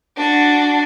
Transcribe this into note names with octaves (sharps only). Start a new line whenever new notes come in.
D4 F#4